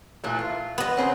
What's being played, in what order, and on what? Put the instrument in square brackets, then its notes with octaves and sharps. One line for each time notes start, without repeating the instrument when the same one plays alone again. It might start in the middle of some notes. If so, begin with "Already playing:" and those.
[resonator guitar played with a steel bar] A#2 E3 A3
F4
[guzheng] B3 D#5
[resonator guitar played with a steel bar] C#3 C4 B4